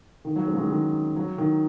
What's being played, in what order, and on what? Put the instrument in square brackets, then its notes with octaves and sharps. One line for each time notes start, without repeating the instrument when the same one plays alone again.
[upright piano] D#3
F#3
G#3 C#4
F#3
D#3 G#3
D#3 G#3
F#3
D#3